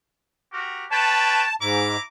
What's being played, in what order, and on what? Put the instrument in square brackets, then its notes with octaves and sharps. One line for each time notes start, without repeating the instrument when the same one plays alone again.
[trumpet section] F#4 G4 A#4
[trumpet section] B4 C#5 G5 [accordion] A5
[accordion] G#2 [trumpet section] E4 A#5 D6